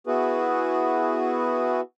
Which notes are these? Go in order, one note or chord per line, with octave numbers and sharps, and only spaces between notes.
B3 E4 F#4 G#4 B4